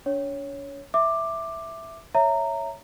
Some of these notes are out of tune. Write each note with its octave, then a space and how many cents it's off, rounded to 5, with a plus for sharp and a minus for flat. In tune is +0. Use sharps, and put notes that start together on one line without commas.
D4 -40 C#5 +0
E5 +0 D6 +10
C#5 +0 E5 +0 A#5 -15